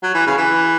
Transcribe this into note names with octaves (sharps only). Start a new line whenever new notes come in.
F#3
E3
C#3
E3